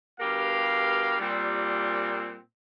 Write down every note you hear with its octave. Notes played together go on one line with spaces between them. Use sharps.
G2 B2 G4 A#4 F5
A#2 G3 C4